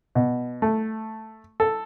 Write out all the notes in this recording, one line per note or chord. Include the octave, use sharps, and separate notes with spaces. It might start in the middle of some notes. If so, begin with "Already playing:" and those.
B2
A3
A4